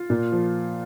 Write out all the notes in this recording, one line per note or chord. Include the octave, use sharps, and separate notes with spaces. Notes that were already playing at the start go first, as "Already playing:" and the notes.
Already playing: F4
A#2
F3